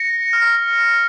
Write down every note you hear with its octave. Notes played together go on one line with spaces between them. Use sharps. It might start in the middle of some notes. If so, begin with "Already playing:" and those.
Already playing: A#6 C#7
F6